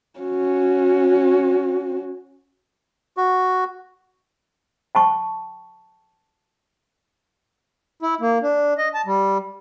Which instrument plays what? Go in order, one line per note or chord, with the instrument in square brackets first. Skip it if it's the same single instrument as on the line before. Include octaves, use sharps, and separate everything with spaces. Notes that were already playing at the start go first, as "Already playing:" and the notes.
[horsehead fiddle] C#4 F#4
[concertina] F#4
[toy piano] G5 A5 C#6
[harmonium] E4
A#3
D4
D#5
A5
G3